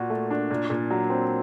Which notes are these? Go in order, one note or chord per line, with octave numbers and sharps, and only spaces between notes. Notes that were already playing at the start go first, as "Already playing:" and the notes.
Already playing: A#2 F#4
A3
D4
A#2
A#2
F#3
C4